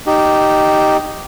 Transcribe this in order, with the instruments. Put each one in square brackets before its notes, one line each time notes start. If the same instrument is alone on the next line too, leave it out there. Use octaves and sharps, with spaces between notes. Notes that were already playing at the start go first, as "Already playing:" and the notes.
[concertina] D#4 G4